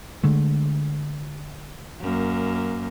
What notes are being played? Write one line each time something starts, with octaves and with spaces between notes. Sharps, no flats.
D3 G#3 A3
F#2 A#3